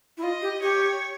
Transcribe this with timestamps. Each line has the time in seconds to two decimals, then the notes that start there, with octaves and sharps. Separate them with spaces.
0.18 E4
0.22 F4 D#5
0.42 G4
0.62 G4 C#5